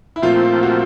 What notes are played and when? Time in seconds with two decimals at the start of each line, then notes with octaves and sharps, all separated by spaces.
0.16 E4
0.22 A#2 F3 A3 C4 F4
0.63 F#4